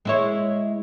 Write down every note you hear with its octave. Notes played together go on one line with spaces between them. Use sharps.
G#3 E4 C#5